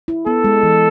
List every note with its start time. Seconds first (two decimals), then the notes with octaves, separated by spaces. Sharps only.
0.08 E4
0.26 B3 A4
0.44 G#3
0.63 E3